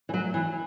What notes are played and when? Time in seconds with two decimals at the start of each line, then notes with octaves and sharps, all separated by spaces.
0.09 E3
0.14 F#3
0.34 E3